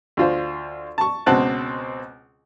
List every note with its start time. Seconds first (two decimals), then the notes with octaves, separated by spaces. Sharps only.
0.17 D2 F4 C5
0.98 A5 C#6
1.26 C#2 B2 C4 F#5 A5 F#6